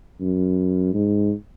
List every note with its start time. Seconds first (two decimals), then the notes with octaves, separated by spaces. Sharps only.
0.20 F#2
0.94 G#2